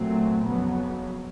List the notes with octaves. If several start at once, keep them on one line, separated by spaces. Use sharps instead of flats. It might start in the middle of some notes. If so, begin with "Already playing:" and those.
Already playing: A#2 F#3 A3 C4
F2 C#3 F#3 B3